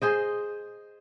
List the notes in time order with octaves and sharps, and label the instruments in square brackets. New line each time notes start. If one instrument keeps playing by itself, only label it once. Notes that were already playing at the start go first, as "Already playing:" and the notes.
[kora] G#4 C5 D#5